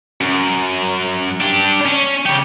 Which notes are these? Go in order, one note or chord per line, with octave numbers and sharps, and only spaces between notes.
F#2
D4 G4
C#4
C#3 G4